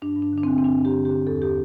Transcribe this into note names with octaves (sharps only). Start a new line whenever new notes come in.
G2 D4
G2
D4
D3 D4
D3 C4
C4
G2 D4
G2
G4
D3
G4
D3
E2 A4
G4